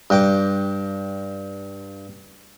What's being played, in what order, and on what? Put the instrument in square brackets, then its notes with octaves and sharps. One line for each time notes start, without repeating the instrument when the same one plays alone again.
[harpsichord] G2 G5 D6